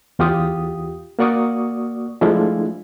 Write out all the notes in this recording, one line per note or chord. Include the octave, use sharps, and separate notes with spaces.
E2 F4 G4 D#6
A#3 F#4 D5 C#6 D#6
F3 G#3 A3 D4 E4 F4